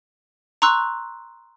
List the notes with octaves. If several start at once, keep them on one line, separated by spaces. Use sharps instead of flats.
A#5 C6 C#6 E6 F#6